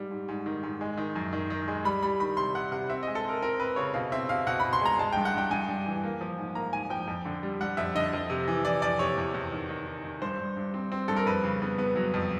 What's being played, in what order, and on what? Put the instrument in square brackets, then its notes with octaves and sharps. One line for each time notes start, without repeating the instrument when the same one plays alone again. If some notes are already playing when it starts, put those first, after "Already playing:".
Already playing: [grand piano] G#2 G3
G#2
G#2
D#3
G#2
G#3
D#3
F#2
D#3
D#3
G#3
G3 B5
G3 B5
D#3 B5
C3 C6
C3 F#5
C3 F#5
C4 E5
G#3 D#5
A4
C4 A#4
C4 A#4
C4 B4
C#3 C#5
B2 F5
C4 E5
B2 F5
B2 F#5
B2 B5
C6
G#3 A#5
G#3 A5
G2 G5
F#5
G2 G5
G2 G#5
G2
E3
A#3
F3
G#2
A#3 A#5
G#2 G#5
F3 G5
F2
D3
G3
G3 F#5
F2 E5
D3 D#5
F2
C3
E3
E3 D5
F2 D5
C3 C#5
E2
E2
D#3
D#3
D#3
D#3
G2 C5
G2
G2
C4
C4
G2 A4
A#4
F2 B4
C#3
B3
B3
F#3
F2